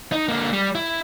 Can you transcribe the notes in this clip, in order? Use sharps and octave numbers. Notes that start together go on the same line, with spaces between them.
D#4
D3 A#3
G3
E4